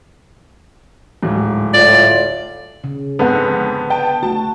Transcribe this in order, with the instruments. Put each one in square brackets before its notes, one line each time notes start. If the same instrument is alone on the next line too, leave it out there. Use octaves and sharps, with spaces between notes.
[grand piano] D1 G#2
[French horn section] A2 F4 [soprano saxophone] D5
[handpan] C#3
[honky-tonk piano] F2 G#2 [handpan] D3 A4 F#5 [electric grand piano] B3
[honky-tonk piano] G5 A5
[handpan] A3 F#4 [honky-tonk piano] A5